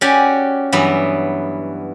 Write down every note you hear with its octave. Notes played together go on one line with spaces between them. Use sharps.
C#4 F#4 G4 D5 G#5
G2 E3 F#3 B3 E4